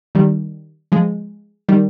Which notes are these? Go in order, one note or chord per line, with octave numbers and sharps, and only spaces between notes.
D#3 G3
F3 G#3
D#3 G3